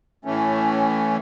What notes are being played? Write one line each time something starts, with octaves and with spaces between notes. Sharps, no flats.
A2 E3 A3 C#4